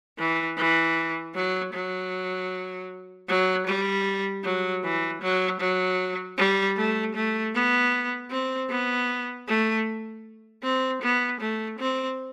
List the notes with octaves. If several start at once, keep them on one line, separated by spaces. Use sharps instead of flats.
E3
E3
F#3
F#3
F#3
G3
F#3
E3
F#3
F#3
G3
A3
A3
B3
C4
B3
A3
C4
B3
A3
C4